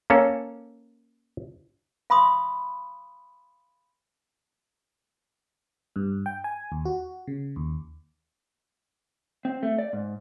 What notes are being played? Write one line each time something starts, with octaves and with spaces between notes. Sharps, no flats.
A#3 C#4 A4 C#5
F5 B5 C6 D#6
G2
G5
G#5
D#2
F#4
C#3
D#2
C4
A3
D5
G#2